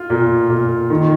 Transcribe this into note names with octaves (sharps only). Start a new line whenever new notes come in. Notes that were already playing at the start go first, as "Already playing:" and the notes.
Already playing: F4
A#2
A#2
D#3